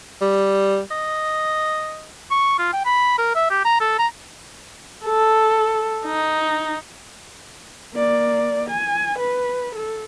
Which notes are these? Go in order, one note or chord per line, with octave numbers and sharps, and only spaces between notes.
G3
D#5
C#6
F4
G5
B5
A#4
E5
G4
A#5
A4
A#5
A4
D#4
A#3 D5
G#5
B4
A4